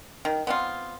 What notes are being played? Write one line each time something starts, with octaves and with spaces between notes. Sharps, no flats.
D#3
B3 C4 F4